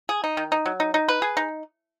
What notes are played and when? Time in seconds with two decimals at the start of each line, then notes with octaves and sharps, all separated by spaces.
0.09 G#4
0.24 D#4
0.37 D#3
0.52 D#4
0.66 F#3
0.80 D#4
0.94 D#4
1.08 B4
1.22 G#4
1.37 D#4